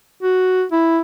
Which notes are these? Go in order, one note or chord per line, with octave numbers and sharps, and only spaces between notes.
F#4
E4